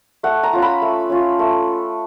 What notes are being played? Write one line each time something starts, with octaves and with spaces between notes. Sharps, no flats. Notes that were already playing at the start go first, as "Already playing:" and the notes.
A3 F#5
A#5
C#4 F4
B5
A3
C#4 F4
A3